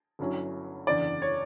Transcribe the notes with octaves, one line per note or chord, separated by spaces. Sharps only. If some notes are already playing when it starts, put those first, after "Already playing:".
G1 G2 F#3 C#4 E4
F#1 E2 D3 D5
C#5